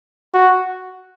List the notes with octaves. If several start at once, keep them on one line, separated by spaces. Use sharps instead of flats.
F#4